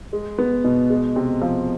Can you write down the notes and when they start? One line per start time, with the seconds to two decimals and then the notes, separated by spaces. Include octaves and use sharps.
0.13 G#3
0.38 B3
0.65 B2
0.90 G#3
1.16 C3
1.42 F3